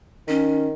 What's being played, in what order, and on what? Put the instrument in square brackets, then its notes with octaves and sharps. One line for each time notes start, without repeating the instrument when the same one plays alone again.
[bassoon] D#3 [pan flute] C#4